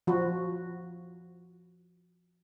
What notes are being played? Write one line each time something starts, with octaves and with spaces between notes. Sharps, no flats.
F3 F#4